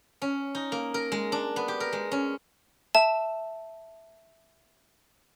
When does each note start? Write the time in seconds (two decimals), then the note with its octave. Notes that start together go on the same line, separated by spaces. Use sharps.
0.22 C#4
0.55 D#4
0.72 A#3
0.94 A#4
1.12 G#3
1.32 D4
1.56 B3
1.68 G4
1.80 A#4
1.93 G#3
2.11 C#4
2.95 E5 A5